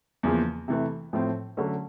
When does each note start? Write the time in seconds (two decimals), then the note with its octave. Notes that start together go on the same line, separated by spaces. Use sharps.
0.23 E2 C#3 F3 A#3
0.68 C3 E3 A3
1.13 A2 F3 A3 C4
1.57 D3 F#3 A3 C#4